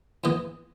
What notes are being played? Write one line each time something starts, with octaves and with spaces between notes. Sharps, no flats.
G#2 E3 G#3 B3 D#5